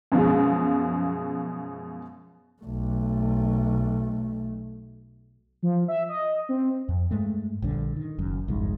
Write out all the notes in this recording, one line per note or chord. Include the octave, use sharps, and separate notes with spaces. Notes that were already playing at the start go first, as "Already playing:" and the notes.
F#2 B2 F3 G#3
B1 A3
F3
E5
D#5
C4
F2
G2 G#3 A3
A#1 G2 D3
D#3
F#1 F#2
G1 C2 F2 G#2